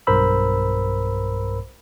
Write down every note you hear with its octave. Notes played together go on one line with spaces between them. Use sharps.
B1 G2 A#4 C5 B5 E6